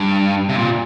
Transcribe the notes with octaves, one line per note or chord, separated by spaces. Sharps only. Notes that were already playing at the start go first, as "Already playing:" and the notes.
Already playing: G2
C3
A#2